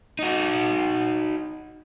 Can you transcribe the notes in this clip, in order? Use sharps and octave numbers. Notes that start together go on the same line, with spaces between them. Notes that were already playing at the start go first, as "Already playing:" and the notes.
D#4 F#4